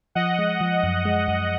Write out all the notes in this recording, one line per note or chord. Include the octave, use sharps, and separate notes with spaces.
F3 D#5 F#5
G#3
F3
F#2
G#3
F#2